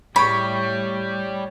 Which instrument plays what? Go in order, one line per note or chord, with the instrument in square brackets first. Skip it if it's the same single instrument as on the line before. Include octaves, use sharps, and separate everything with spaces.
[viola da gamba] A2 [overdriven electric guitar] G3 [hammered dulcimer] C#5 [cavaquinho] B5